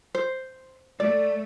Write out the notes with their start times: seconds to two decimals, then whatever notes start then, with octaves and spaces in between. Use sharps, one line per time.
0.15 C5
1.00 A3 D5